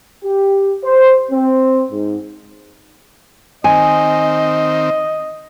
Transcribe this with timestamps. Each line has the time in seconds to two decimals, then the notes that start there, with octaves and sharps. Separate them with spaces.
0.24 G4
0.84 C5
1.32 C4
1.91 G#2
3.64 D#3 C4 D#5 G#5